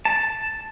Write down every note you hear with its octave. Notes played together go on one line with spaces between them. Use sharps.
A5